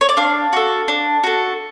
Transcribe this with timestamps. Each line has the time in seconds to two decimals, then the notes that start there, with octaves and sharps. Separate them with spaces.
0.01 C#5
0.09 D5
0.17 D4 F5
0.53 F#4 A4
0.88 D4
1.24 F#4 A4